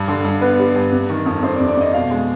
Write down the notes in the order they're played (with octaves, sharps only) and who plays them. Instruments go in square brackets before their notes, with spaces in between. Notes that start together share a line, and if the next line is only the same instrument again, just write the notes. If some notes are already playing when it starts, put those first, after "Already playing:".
Already playing: [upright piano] G2
D3
G2
B3 B4
G3
G2
C3
D#3
F2
F2 C5
D5
C3
D5
F2 D#5
B2 F5
G#3